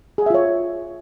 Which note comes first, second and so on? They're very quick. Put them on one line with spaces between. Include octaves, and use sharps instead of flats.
G#4 F#5 E5 F4 C#5